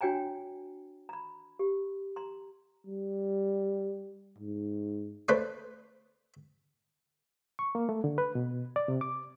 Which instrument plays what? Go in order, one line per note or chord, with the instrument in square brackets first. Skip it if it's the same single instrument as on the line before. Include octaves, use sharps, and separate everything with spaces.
[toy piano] D4 F#4 C#5 G5 G#5 A#5
A#5 B5
G4
A#5 C6
[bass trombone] G3
G#2
[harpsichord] A3 B4 C5 D5
[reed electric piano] C#6
A#3
A3
D3
B4
B2
D5
C3
D6